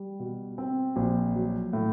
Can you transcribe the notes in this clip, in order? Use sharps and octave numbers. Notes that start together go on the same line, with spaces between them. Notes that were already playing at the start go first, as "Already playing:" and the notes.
Already playing: G3
B2
C4
A#1
F#3
A2